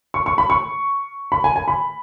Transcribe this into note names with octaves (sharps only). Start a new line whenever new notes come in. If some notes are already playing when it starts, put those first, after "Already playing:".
C#6
C#6
B5
C#6
B5
G#5
G#5
B5